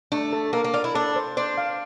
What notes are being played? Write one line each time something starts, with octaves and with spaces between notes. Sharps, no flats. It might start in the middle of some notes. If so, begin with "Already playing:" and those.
A3 D4
A4
A#3 A#4
A#3
F4 D5
E4
D4 A4
C5
D4 C5
F5